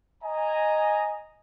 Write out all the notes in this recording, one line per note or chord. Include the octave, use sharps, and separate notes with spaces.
D#5 G#5 A#5